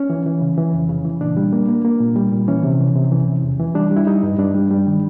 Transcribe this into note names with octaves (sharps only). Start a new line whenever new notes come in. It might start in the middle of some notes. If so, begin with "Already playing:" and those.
Already playing: C#4
E3
E3
C#3
E3
F2
C#3
E3
A#2 D4
G3
A#3
A#3
A#3
A#2
G3
A#2
E3 C#4
C3
E3
C3
E3
C3
E2
E3
G3 D4
G3
E4
G3 D#4
G2
G2 D4
G3
G3
D#3